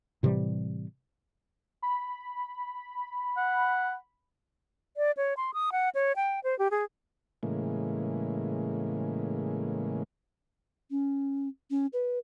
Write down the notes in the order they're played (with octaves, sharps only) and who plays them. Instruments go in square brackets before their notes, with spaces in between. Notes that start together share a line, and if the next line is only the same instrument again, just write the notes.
[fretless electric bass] A2 C3 E3 G3
[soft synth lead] B5
[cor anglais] F#5
[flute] D5
C#5
C6
D#6
F#5
C#5
G5
C5
G4
G#4
[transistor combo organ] A2 C#3 E3 G#3 A#3
[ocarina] C#4
C#4
B4